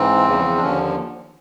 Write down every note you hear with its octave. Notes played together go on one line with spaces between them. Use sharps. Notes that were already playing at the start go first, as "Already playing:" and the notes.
Already playing: G#2 E3 C4
E2 C#3 F3
D4
D#2 D3 F3 C#4